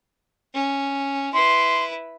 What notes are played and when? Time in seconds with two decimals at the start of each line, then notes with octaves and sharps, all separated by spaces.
0.54 C#4
1.33 E4 B4 C6